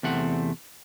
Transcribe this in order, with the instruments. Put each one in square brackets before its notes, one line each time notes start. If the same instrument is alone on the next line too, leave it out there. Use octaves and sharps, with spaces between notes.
[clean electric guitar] E2 C3 A3 C4 F#5